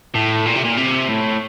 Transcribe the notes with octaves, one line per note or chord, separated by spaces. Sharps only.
A2
A#2
C3
A#2
C3
A2